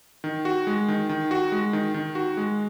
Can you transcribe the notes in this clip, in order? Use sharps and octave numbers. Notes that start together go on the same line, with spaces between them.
D#3
F#4
G#3
D#3
D#3
F#4
G#3
D#3
D#3
F#4
G#3